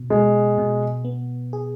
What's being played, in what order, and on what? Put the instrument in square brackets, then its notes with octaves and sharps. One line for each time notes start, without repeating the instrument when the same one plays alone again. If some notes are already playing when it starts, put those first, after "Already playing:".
Already playing: [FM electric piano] B2
[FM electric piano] B2 [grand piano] G#3
[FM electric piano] B2
B3
G#4